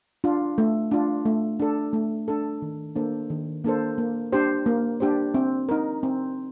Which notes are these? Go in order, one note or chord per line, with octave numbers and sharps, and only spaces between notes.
D4 F4
A3
D4 F4
A3
D4 A4
A3
D4 A4
D#3
A#3 D4 A4 C5
D#3
A#3 D4 A4 C5
A#3
D4 G4 C5
A#3
D4 G4 C5
C4
D#4 A#4
C4